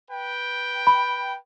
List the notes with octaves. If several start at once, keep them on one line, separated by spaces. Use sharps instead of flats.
B4 G5
B5